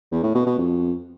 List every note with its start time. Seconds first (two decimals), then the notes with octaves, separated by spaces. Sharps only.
0.11 E2
0.23 A2
0.35 B2
0.46 B2
0.58 F2